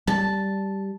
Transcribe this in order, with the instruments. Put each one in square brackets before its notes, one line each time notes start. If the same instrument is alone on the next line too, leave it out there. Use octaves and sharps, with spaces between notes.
[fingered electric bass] G3 [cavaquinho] A5